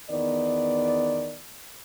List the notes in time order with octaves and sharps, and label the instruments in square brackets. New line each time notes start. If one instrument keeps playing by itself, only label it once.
[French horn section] E2 D#3 B3 D5